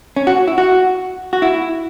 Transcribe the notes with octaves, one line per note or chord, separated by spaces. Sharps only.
C#4
F#4
E4
F#4
F#4
E4